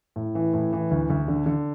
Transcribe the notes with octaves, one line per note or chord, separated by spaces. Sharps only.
A2
E3
A2
E3
D2
D2
D3
D3